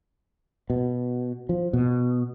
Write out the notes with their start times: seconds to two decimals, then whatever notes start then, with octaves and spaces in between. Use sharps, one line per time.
0.70 B2
1.49 F3
1.73 B2